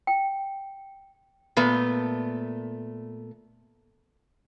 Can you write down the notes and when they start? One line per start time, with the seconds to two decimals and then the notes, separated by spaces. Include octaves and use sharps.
0.07 G5
1.57 A#2 A3 B3